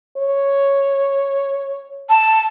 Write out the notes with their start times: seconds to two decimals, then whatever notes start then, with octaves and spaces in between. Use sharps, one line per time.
0.17 C#5
2.09 A5